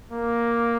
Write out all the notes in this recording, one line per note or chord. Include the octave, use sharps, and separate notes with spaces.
A#3